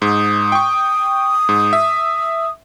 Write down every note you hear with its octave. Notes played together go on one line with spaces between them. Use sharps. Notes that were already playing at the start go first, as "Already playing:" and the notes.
G#2 D#6
G5 C#6
G#2
E5